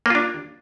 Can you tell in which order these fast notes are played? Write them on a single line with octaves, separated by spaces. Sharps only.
A#3 F4 D4